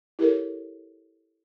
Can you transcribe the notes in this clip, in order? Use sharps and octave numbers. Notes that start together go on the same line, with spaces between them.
E4 G4 A4 A#4 C#5